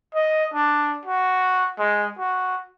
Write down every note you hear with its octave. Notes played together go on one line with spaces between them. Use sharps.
D#5
D4
F#4
G#3
F#4